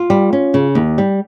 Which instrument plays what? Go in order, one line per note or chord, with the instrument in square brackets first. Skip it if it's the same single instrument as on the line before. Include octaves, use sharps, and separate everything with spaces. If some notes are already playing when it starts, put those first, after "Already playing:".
Already playing: [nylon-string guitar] F4
G3
C#4
C#3
D#2
G3